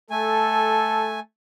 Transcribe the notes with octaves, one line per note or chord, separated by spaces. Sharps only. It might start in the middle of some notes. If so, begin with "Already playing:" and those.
A3 A4 G#5